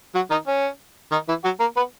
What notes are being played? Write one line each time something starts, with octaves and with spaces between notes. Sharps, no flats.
F#3 F#4
D#3 D#4
C#4
D#3 D#4
E3 E4
F#3 F#4
A#3 A#4
B3 B4